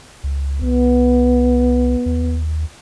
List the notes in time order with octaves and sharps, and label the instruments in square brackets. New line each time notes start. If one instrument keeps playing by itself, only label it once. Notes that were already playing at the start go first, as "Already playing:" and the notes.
[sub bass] C#2
[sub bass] C2 [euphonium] B3
[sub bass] D#2